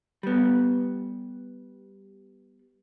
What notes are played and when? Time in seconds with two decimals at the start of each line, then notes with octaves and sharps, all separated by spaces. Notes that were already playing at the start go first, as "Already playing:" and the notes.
0.23 G3 B3